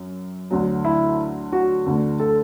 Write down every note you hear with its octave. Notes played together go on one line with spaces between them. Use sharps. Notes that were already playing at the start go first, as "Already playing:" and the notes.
Already playing: F#2
D2 D3 F#3
E4
F#4
D2 D3 A3
A4